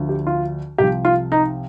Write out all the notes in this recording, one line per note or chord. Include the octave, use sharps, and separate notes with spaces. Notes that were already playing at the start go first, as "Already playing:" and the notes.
Already playing: D2 D3 F3
G4
F4
C2 C3 F3 G4
F4
D#4